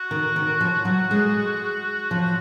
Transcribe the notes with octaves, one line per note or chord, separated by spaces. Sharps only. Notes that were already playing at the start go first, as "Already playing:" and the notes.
Already playing: F#4
D#3
D#3
F3
F#3
G#3
F3